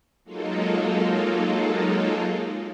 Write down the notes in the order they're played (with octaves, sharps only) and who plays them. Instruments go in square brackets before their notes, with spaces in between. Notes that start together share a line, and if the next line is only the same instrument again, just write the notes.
[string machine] F#3 G#3 A#3 D#4 F4 A4